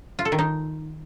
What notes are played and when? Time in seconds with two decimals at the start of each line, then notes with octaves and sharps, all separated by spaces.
0.19 F4
0.25 A4
0.32 D#3
0.39 D#4